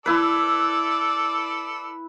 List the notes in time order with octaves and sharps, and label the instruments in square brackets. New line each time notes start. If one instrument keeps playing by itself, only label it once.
[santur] E4 B4 [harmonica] A4 D5